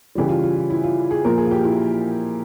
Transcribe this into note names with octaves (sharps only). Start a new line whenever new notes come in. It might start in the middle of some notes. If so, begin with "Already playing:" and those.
C#3 E3 G3 G4
F4
F4
F4
E4
F4
G#4
A#2 F3 A#4
G#4
F4
G4
E4